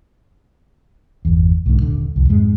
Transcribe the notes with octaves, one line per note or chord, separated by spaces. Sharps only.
G1 E2
B1 G#2 D3
D#1 D3
C2 F2
F2 G#2 G#3